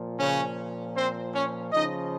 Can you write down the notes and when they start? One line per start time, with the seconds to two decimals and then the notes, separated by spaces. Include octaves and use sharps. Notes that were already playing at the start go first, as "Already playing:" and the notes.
Already playing: A#2 F3
0.18 C#3 C#4
0.96 C4 C5
1.34 C#4 C#5
1.73 C#3 F3 D#4 D#5